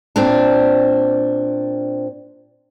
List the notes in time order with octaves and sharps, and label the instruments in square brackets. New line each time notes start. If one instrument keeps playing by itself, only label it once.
[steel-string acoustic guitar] A#2 C4 D4